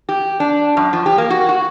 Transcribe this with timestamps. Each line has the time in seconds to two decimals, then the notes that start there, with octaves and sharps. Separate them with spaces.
0.09 G4
0.40 D4
0.77 F#2
0.93 F3
1.06 G4
1.18 A#3
1.30 F#4
1.49 F#4